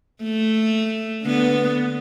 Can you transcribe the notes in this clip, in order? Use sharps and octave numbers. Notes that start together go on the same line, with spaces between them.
A3
D3 B3